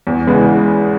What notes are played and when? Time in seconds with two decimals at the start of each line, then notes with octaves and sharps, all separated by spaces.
0.07 E2
0.27 C#3 E3 G#3 B3